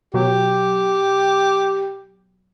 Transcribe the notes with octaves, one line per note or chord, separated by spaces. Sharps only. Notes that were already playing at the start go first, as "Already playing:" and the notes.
B2 F#3 G4